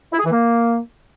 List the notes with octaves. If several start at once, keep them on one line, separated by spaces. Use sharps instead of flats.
E4
G#4
E3
A#3